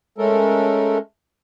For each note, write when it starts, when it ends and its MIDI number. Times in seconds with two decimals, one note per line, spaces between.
0.18 0.98 56
0.18 0.98 57
0.18 0.98 61
0.18 0.98 69
0.18 0.98 70